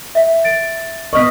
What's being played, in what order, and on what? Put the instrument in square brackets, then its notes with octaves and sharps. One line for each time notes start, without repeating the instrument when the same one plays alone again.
[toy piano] E5
[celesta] A6 D7
[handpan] B3 D#5 [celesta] C#6 F6 B6